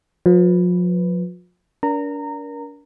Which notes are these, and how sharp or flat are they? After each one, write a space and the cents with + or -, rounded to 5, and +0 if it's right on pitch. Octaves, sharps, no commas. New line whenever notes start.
F3 +40 B4 +0
D4 -35 A#4 +25 A#5 -20